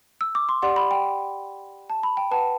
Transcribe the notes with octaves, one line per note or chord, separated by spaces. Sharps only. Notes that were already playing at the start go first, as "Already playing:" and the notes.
E6
D6
C6
G4 D5 F#5 C6
B5
G5
A5
B5
G5
B4 F#5 A5